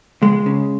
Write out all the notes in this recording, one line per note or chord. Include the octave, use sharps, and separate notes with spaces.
C#2 G#3
C#3